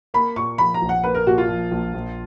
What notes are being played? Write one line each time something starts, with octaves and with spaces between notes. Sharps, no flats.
A#3 B5
A#2 C#6
F3 B5
A#5
A#1
F#5
A#3 B4
A#4
A#2 F#4
F4
F3
A#1
A#1